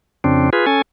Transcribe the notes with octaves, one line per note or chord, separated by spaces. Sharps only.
F2 C#3 C4 D4
F4 G#4 B4
C#4 A4 G#5